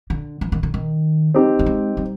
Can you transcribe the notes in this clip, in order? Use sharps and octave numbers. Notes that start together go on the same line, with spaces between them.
D3
E3
D#3
D3
D#3
C4 D#4 G4
A3
G#3
G3